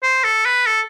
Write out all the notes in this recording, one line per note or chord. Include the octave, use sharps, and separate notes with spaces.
C5
A4
B4
A4